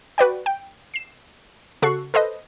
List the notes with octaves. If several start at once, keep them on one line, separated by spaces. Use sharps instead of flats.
F#4 B4 D5 G5
G5
C7 E7
C#3 F#4 A4 C#6 F#6 C7
A4 B4 C5 D#5